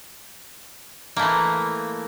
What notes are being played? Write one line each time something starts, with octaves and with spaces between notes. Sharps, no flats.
E3 A3 A#3